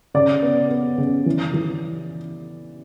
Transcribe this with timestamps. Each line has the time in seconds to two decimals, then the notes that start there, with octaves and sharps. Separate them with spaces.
0.14 C#3 D5
0.42 B3
0.70 B3
0.98 C#3
1.26 E3
1.54 E3